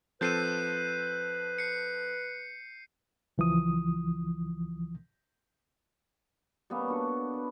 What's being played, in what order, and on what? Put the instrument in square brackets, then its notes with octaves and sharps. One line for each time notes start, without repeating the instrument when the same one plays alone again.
[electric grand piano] F3 C4 A4 [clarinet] B4 [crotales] G6 C7 D#7
[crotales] C7 C#7
[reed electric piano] C#2 E3 F3 D#6
[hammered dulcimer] G3 A#3 B3 C#4
D4 F#4 A4
B4